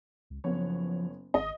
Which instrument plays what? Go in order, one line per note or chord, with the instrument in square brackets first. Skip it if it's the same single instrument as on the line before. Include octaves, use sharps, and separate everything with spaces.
[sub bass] C#2
[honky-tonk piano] F#1 B3 C#5 [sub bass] F3
[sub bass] G#1 [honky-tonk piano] D#5